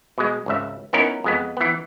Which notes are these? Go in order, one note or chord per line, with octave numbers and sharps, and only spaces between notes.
B2 G#3
G#1 C#2 E5
B3 C#4 D#4 E4 A#4
F2 G#3 B3
E3 B3